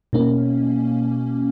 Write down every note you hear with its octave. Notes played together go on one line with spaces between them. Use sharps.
B2 A#3 C#4